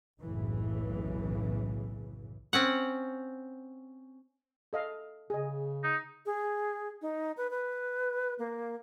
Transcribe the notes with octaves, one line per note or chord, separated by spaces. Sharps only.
F#1 B1 A2 C#3 E3
C4 C#4 F#5
A4 D#5 F5
C#3 G#4 D#5
D#4
G#4
D#4
B4
B4
A#3